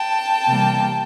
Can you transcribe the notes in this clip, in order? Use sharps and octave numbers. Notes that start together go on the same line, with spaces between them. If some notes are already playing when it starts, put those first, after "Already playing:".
Already playing: G5 A5
C3 E3 G3 A#3